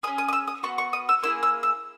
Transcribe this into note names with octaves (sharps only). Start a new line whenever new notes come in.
C#4 G#4 D#6
D#6
D#6
E6
D#6
B3 F#4 C#6
C#6
D#6
E6
A#3 E4 G#4 E6
E6
E6